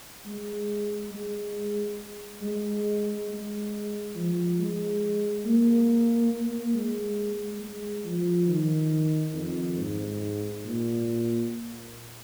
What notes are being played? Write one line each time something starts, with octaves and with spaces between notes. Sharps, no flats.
G#3
G#3
G#3
G#3
F3
G#3
A#3
G#3
G#3
F3
D#3
F2
G#2
A#2